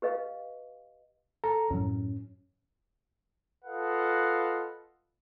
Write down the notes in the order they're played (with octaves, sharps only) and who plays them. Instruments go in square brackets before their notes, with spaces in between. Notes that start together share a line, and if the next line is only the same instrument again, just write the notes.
[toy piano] G4 B4 D#5 F5
[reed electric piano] A4 A#5
[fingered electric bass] F#2 A2 F#3 [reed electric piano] C#4
[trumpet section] F4 A4 B4 D#5 F5 F#5